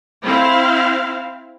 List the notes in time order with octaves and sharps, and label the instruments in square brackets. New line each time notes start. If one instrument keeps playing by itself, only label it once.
[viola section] C4 E4 F5